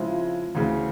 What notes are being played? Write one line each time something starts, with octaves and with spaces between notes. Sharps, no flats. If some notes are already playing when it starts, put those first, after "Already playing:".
Already playing: C#3 F3 G#3 C4 E4
D2 C#3 E3